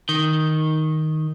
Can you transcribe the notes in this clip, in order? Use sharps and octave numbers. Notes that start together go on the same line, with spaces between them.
D#3